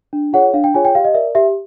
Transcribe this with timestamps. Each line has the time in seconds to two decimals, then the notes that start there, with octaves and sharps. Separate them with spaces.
0.13 D4
0.33 F4 G#4 C#5 F#5
0.54 D4 F5
0.64 G5
0.74 F4 G#4 C#5 G#5
0.85 G5
0.95 G4 F5
1.05 D#5
1.14 A#4 D5 E5
1.35 G4 E5